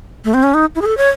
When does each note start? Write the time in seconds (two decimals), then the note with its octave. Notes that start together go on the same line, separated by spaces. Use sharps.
0.25 A3
0.34 C4
0.43 C#4
0.54 D#4
0.75 E4
0.82 G#4
0.86 A4
0.97 C#5